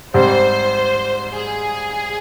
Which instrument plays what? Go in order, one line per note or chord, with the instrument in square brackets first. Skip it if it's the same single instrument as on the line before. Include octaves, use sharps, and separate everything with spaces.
[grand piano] G#2 G3 C4 [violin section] C5
[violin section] G#4